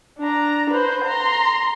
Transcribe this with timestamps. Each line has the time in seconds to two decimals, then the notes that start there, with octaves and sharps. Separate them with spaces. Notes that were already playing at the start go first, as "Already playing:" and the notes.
0.18 D4 A#5
0.70 B4 C5
1.05 A#5 C6